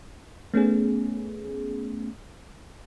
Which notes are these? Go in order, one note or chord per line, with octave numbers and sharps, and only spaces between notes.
A3 B3 C#4 G#4